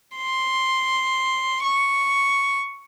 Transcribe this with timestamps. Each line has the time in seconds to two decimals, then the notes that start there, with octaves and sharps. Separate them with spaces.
0.17 C6
1.63 C#6